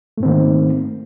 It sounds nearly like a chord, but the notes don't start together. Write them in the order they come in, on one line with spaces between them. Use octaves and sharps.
A3 G#2 C4 D#3 A#3